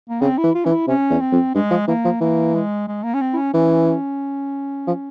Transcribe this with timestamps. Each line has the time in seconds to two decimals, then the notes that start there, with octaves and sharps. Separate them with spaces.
0.09 A#3
0.21 C#3 C4
0.38 E4
0.44 E3
0.55 F4
0.65 E3 C#4
0.71 E4
0.87 C3 C#4
1.10 E2
1.20 C4
1.32 F2
1.55 G2 G#3
1.71 F3
1.88 E3 A#3
2.04 F3
2.21 E3 A#3
2.54 G#3
2.88 G#3
3.03 A#3
3.14 C#4
3.21 C4
3.33 E4
3.37 C#4
3.54 E3 C#4
4.87 F3